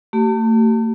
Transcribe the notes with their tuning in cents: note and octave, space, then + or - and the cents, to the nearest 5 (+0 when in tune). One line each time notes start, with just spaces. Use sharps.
A3 +35 G4 -40